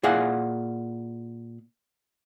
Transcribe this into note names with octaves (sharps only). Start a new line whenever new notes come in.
A#2 E4 G#4 F5 F#5